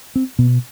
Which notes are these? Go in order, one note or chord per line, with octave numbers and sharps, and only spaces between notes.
C4
B2 B3